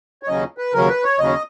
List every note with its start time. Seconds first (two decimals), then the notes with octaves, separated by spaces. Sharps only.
0.23 C#5
0.28 D#2 C#3 F#3 C#4 D#5
0.58 B4
0.73 D#2 C#3 F#3 C#4 A#4
0.89 B4
1.04 C#5
1.19 D#2 C#3 F#3 C#4 D#5